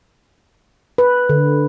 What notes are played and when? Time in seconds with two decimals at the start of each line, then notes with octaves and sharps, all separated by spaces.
0.98 B4
1.29 D3